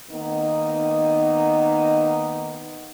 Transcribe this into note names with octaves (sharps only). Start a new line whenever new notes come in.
D#3 A#3 B3 D#4